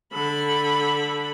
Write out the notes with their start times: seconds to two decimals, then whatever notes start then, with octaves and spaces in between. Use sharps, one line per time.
0.13 D3 B5